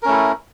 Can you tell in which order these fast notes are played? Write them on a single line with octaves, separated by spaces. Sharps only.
A#4 C#4 A3 E4